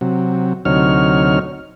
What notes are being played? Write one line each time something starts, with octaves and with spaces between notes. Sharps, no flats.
C3 F#3
D2 C3 F#3 D#4 C#5 F6